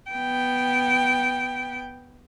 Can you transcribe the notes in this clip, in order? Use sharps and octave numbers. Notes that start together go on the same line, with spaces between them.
B3 G5